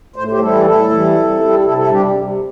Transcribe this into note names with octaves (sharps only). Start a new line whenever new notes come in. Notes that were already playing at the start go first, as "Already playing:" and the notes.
A2 C5
G4 C5
E3 G3 E4 A4
A2 E4 A4
E3 G3
C3
G3
C3 E4 A4
E4 A4
G3 D4 G4
C3